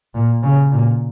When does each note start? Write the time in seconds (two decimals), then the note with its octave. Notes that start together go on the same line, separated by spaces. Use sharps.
0.14 A#2
0.43 C#3
0.71 A#2